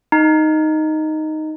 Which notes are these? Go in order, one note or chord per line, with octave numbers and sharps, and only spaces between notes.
D#4